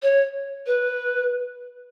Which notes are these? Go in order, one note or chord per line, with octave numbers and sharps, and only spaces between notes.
C#5
B4